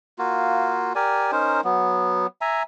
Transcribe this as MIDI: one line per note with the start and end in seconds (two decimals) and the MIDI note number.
0.19 0.93 58
0.19 0.93 65
0.19 0.93 66
0.95 1.31 67
0.95 1.31 70
0.95 1.31 74
0.95 1.31 80
1.32 1.61 61
1.32 1.61 63
1.32 1.61 70
1.32 1.61 72
1.64 2.27 54
1.64 2.27 59
2.41 2.63 76
2.41 2.63 80
2.41 2.63 82